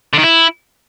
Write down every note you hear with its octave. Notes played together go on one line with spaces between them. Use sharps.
D3
D#3
E4